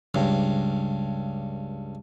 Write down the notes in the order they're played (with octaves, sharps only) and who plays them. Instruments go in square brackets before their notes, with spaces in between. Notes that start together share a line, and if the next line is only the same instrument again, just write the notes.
[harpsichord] C#2 G2